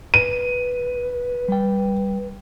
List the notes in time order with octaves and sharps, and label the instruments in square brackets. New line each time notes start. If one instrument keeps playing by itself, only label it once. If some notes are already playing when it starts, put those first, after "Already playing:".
[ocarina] B4 [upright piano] D#7
[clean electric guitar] G3 G5